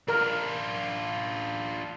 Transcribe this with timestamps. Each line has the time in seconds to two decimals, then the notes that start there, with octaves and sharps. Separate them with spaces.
0.08 D4 F4 A#4